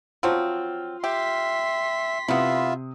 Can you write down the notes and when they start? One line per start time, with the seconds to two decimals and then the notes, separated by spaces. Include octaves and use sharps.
0.23 F3 F#3 C4 F4
1.04 G4 E5 C6 B6
2.28 C3 B3 E4 F4 E5 D#6